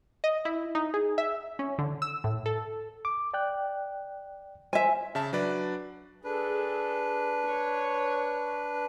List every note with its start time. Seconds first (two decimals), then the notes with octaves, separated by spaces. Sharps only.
0.24 D#5
0.45 E4
0.75 D#4
0.94 G#4
1.18 E5
1.59 C#4
1.79 D3
2.02 E6
2.24 A2
2.46 A4
3.05 D6
3.34 D5 G5 F#6
4.73 C5 E5 G#5
5.15 C#3 E5 A5
5.33 F#3 D4 B4 D5
6.24 D4 G#4 A4 B4
7.47 C#5